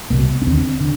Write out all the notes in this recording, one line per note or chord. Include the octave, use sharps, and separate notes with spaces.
C2 B2 A#3
C#4
D#2 D3 C4
D3